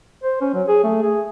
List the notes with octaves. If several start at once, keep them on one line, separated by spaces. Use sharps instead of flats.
C5
C#4
F#3
G#4
A3
G#4